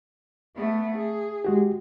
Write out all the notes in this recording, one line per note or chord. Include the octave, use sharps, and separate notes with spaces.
A3 B3
G#4
G#3 F#4 G4